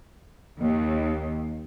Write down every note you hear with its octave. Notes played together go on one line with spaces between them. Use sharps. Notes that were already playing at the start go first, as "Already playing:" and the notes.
D#2